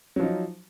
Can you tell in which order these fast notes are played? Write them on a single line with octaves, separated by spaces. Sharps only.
F#3 F3 D#4